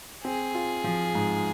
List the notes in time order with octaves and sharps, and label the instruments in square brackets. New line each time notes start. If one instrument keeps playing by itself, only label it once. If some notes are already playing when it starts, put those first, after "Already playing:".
[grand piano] C4 [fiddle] G#4
[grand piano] F4
F3
G#2